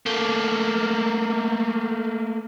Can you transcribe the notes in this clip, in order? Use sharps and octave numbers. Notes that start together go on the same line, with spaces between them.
A3 A#3